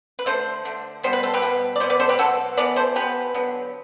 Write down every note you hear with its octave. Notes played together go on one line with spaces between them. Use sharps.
B4
D3 A3 A4 C5
D3 A3
B2 G3 B3 C5
B4
A4
G4 B4
B2 G3 B3
D5
B2 F#3 B3 C5
B4 D5
A4 C5
G4 B4
B2 F#3 B3 F#4 A4
E3 B3 B4 D5
A4 C5
E3 B3 G4 B4
D3 F#3 B3